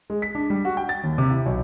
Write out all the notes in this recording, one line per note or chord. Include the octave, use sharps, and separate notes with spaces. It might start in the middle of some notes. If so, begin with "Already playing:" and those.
G#3
B6
D4
G3
F#4
G5
A6
D#2
C3
E4
B1